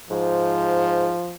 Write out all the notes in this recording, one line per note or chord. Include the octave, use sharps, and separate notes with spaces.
G#2 F3